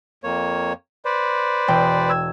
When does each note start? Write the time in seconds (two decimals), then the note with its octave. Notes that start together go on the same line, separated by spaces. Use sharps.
0.24 F2 A#3 C#5
1.05 B4 C5 D5
1.68 E1 G5
2.10 E6 G#6